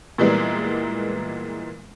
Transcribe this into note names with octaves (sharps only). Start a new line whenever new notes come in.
A#2 E3 G3 G#3 A#3 B3